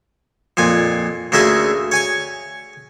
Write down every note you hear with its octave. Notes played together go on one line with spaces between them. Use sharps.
F2 A#2 G#5
D2 C#3 A#4 E5 G#5 C6
C#5 G#5 C#6